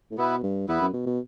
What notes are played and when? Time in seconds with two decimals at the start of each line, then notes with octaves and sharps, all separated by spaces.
0.11 A2
0.18 B2 B3 E4 B4
0.43 G2
0.68 E2 B3 E4 B4
0.81 F#2
0.93 B2
1.06 B2